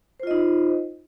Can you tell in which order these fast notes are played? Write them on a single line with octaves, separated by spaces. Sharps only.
C5 F4 D#5 D#4